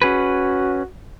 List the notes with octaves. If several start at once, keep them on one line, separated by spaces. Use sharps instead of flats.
C#4 F#4 G#4 B4